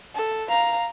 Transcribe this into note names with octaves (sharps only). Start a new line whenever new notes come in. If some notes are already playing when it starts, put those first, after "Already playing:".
A4
F5 A#5